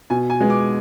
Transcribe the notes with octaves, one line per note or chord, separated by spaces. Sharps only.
B2 G#5
G#5
G#3 B3
D6